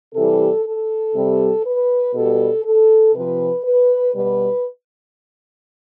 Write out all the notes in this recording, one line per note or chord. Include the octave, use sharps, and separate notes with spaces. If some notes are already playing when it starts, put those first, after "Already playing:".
C3 E3 G3 A4
A4
C3 G3
B4
B2 G3 A4
A4
C3 F3 B4
B4
B2 G3 B4